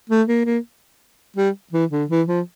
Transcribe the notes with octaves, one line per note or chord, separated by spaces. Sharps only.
A3
A#3
A#3
G3
E3
D3
E3
F3